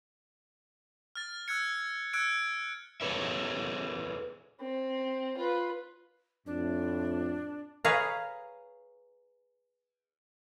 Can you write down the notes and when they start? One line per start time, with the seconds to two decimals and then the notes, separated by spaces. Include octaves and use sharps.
1.15 F6 A6
1.48 E6 F#6 G#6 C#7
2.13 E6 F#6 G#6 C#7 D7
3.01 G#4 A4 B4 C#5 E5
4.60 C4
5.37 F4 B4
6.46 F2 A2 D4
7.85 G#4 B4 C#5 F5 A#5